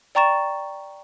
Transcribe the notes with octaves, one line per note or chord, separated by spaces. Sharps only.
D5 G5 A#5 C#6 A6 E7